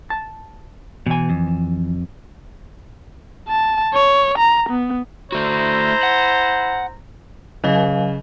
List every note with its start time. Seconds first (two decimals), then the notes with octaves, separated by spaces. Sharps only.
0.10 A5
1.06 B2 E3 G#5
1.30 F2
3.49 A5
3.94 C#5
4.38 A#5
4.69 B3
5.32 A3 E4 F#4 C5 A#5
6.03 F#5
7.64 C#3 F#3 D#5 F5